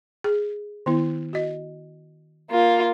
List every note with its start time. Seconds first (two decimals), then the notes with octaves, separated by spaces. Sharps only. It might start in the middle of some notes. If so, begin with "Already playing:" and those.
0.24 G#4
0.86 D#3 B3 E4
1.33 F#4 D#5
2.50 A#3 F4